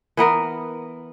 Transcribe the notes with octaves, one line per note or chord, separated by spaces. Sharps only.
E3 B3 A#4